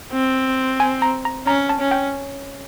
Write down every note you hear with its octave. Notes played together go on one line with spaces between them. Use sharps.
C4
G#5
A#5
A#5
C#4 A#5
A5
C#4
G5